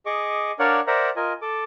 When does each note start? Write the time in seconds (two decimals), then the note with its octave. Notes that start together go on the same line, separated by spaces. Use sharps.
0.06 G#4 D#5 C#6 D6
0.59 D4 A#4 C#5 D5 F5 F#5
0.87 A#4 C5 D5 E5 F#5 A#5
1.16 F4 A#4 D#5 G#5
1.42 A4 D6